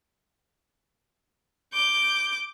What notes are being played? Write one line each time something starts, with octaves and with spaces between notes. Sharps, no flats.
D6 G6